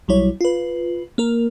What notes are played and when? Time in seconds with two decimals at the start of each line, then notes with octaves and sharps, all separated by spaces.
0.08 B1 F#3 G3 E4 C#5
0.41 F4 B4
1.18 A#3 A#4